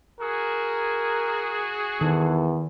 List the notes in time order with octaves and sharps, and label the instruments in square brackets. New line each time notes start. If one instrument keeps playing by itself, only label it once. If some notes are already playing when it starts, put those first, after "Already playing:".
[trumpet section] F#4 G#4 [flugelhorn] A#4
[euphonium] E2 [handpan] D#3 [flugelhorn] A4